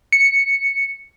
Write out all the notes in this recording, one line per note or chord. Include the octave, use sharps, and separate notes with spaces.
C#7